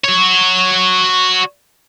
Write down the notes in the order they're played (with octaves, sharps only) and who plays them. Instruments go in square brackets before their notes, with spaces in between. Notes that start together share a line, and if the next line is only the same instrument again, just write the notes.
[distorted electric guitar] F#4 C#5